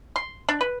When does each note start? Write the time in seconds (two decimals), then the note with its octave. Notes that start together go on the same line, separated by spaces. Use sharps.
0.16 C6
0.49 D4
0.61 B4